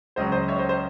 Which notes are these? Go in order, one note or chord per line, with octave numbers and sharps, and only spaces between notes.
C#2 C#3 F#3 C5 D#5
C5 D#5
C#5 E5
C5 D#5
C5